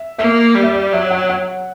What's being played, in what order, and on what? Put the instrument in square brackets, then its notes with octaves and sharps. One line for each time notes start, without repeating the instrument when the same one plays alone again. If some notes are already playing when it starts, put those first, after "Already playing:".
Already playing: [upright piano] E5
[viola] A#3 [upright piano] E5
[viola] G3
[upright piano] E5
D5
[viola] F#3 [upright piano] E5
[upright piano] F#5
F#5